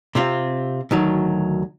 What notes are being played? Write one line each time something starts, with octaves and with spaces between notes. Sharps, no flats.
C3 C4 F4
D2 D#3 F#3